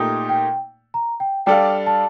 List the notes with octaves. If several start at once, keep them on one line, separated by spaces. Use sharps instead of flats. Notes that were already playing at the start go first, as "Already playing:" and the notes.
Already playing: A#2 A3 D#4 G4
G5
A#5
G5
G3 D4 A4 D5 F5 G5
A5